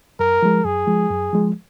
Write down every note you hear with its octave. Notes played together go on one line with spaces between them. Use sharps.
F#2 A#4
F3 G#3
F#2 G#4
F3 G#3
F#2
F3 G#3